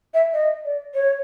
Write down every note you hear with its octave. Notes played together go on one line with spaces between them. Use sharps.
E5
D#5
D5
C#5